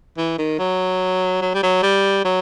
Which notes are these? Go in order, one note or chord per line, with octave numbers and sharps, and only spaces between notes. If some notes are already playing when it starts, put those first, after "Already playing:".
E3
D#3
F#3
F#3
G3
F#3
G3
F#3